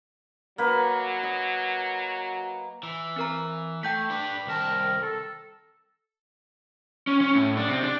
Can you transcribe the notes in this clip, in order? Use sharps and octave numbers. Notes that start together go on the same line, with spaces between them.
F#3 A#3 B4 D#5
D#5
E3
C4 A#4 A#5
A3 G5 G6 B6
D4 B4
C2 D#3 A#4 A5
A4
C#4
C#4
A2
D4
C3
D4